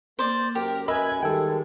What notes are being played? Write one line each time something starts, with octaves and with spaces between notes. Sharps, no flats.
A#3 C5 D5
F#2 G4 A#4
A#4 B4 D#5 E5 G#5 B5
D#3 G3 G#3 A4 G5